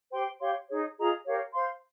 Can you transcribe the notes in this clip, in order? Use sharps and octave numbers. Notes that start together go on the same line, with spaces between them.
G4 C5 G5 C6
G4 C#5 F5 C6
D#4 G#4 C#5
F4 G#4 D#5 A#5
G4 A#4 C#5 F5
C5 F5 C6